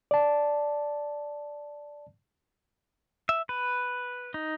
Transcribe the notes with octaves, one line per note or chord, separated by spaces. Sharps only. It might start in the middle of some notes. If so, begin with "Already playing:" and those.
D5 A5
E5
B4
D#4